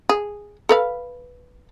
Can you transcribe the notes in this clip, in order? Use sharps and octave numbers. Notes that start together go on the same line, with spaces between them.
G#4
A4 B4 F5